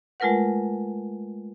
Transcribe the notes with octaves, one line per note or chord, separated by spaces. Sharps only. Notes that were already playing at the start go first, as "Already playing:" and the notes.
G#3 A3 F4 A#4 B4 F#5